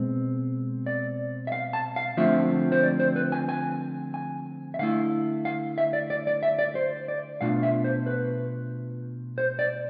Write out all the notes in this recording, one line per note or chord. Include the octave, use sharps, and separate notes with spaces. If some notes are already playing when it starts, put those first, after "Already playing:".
Already playing: B2 G#3 C4
D5
E5
F5
A5
F5
D3 F3 A3 C4 F4 E5
C5
D5
C5
B4
G#5
G#5
G#5
E5
D3 A3 E4 F5
F5
E5
D5
D5
D5
E5
D5
C5
D5
B2 A3 D4 F4 F5
E5
C5
B4
C5
D5